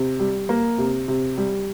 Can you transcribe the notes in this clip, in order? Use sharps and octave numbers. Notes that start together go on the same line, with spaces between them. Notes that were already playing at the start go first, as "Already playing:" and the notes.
Already playing: C3
G3
A#3
C3
C3
G3